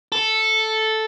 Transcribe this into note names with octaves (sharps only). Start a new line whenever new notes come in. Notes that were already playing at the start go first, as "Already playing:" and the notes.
A4